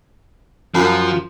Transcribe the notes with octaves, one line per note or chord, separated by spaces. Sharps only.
F#2 F3